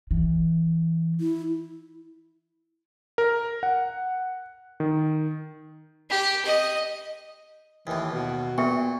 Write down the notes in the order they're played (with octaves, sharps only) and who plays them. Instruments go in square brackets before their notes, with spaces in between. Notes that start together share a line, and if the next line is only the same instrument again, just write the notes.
[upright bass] E3
[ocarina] E4
[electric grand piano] A#4
F#5
D#3
[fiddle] G4
D#5
[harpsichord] D#2 A2 [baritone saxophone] E3
[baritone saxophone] B2
[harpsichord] A#2 [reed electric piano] B3 [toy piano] E5 G5 C#6